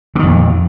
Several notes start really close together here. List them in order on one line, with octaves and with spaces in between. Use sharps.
D3 D#3 F2 A#2